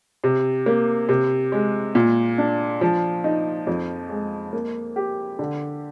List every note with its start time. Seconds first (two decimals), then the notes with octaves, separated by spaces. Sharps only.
0.24 C3
0.66 A#3
1.09 C3
1.52 G#3
1.95 A#2
2.38 D4
2.81 F3
3.24 D#4
3.67 F2
4.10 G#3
4.53 A#3
4.96 G4
5.39 D3